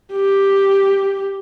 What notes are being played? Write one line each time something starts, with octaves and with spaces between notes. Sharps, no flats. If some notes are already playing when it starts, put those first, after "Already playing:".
G4